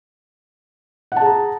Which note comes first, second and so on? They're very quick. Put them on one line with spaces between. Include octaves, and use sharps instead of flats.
F#5 A5 G#4 A#5